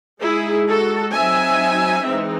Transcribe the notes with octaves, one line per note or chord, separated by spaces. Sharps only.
G#3 D#4 E4 G#4
F#4 A4
F#3 C4 D#4 E5 G#5
E3 G#3 C4 D#4